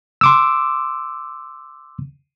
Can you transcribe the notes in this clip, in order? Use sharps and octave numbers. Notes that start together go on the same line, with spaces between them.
C6 D6 E6